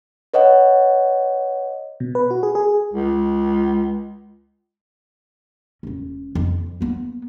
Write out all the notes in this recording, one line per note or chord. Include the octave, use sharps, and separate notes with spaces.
B4 C#5 D#5 F#5
B2
B4
F#4
G#4
G#4
C#2
E1 C#4
F2
A#3 B3